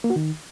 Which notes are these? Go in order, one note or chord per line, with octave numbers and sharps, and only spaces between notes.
A#3
F#4
D#3